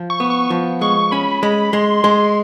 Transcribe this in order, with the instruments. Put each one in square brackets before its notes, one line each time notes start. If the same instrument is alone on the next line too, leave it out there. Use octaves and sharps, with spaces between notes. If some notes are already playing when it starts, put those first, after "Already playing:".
Already playing: [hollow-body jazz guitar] F3
[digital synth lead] C#6
[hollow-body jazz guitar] B3
[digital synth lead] C#6
[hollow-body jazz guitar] F3
[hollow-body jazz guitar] G#3 [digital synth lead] C#6
[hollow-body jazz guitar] C#4 [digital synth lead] B5
[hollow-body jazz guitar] G#3 [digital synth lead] B5
[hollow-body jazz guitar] G#3 [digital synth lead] C6
[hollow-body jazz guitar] G#3